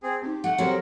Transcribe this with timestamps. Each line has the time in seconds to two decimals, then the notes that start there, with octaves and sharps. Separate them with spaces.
0.03 C4 G#4
0.22 C4 D#4 G4
0.44 A3 F#5
0.58 F#3 C4 G4 A4 A#4 C5 C#5